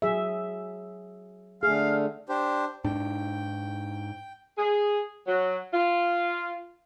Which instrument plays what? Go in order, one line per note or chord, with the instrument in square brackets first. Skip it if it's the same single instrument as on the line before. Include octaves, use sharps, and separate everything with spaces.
[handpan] F#3 G#4 E5
[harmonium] D3 A3 [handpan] G#4 [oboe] F5
[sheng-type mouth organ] D4 G4 C5
[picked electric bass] G#2 D4 [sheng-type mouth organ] G5
[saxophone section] G#4
F#3
F4